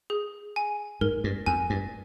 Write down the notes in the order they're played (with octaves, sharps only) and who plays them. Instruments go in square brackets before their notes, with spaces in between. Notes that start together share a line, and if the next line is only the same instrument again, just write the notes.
[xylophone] G#4
G#5
[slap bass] G#2 [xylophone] A#4
[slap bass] G2
[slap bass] F2 [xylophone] G#5
[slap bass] G2